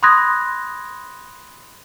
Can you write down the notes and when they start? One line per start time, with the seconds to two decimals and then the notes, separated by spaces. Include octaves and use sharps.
0.03 B5 C6 D#6 F#6 G#6 A#6